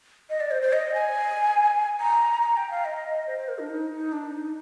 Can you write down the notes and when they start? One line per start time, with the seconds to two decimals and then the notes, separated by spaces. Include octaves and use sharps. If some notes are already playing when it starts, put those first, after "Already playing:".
0.30 D#5
0.40 D5
0.51 C5
0.62 C5
0.73 D#5
0.94 G#5
2.00 A#5
2.42 A#5
2.57 G5
2.71 F5
2.85 D#5
3.27 C5
3.38 C5
3.48 A#4
3.59 D4
3.70 D#4
3.91 D#4
4.12 D4
4.34 D#4